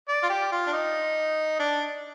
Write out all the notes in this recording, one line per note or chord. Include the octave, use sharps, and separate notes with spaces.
D5
F4
G4
F4
D4
D#4
D4